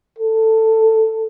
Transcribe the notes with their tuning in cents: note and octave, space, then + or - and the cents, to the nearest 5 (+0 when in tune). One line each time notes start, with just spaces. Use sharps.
A4 +15